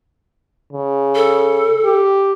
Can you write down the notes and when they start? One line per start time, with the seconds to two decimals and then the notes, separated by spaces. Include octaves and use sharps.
0.73 C#3
1.15 A4
1.85 G4